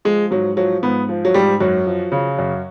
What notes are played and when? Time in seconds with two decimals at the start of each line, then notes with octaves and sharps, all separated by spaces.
0.05 F3 G#3
0.31 G#2 F#3
0.57 F3 F#3
0.83 G#2 B3
1.09 F3
1.25 F#3
1.34 G#2 G3
1.60 F#2 F#3
1.86 F3
2.12 C#3
2.38 F#2